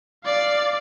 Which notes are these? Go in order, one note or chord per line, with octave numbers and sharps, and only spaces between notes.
D5 F5